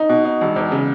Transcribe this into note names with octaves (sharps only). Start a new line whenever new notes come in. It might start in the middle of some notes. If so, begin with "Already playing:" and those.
Already playing: D#4
B2
D#4
E1
E2
C#3